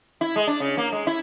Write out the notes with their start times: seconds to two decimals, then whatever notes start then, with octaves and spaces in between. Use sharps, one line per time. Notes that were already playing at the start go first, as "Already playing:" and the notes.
0.21 E4
0.36 G#3
0.47 D4
0.60 C#3
0.77 A#3
0.92 G#3
1.07 E4